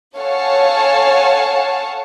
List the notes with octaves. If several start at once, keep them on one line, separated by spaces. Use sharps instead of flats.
A4 C#5 F5 F#5 G#5 A5